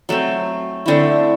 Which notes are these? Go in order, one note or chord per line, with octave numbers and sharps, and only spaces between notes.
F#3 A3 C4
D3 A3 C4 E4